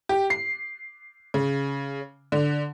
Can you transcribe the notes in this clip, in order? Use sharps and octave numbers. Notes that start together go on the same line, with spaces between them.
G4
C7
C#3
D3